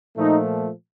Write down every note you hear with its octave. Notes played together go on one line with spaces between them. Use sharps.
A#2 F3 A3 D#4